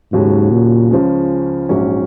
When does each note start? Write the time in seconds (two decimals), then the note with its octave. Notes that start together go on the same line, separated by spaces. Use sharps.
0.12 D#2 G#2 C#3 F#3
0.52 A#2
0.91 C#2 C#3 F3 G#3 C#4
1.69 A#1 G#2 F#3 C#4